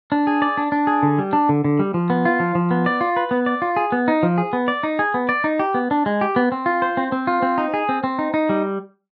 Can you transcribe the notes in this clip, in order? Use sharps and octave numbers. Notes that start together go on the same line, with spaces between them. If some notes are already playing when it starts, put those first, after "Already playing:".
D4
G#4
D5
D4
D4
G#4
D3
G3
D4
D3
D3
G3
F3
B3
F4
F3
F3
B3
D5
F4
B4
B3
D5
F4
G#4
B3
D#4
F3
G#4
B3
D5
D#4
G#4
B3
D5
D#4
G4
B3
D4
G#3
G4
B3
C4
F4
C5
C4
C4
F4
C4
D#4
G#4
C4
C4
D#4
D#4
G3